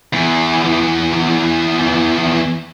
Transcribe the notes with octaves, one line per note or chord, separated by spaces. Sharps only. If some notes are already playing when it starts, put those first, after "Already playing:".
E2 E3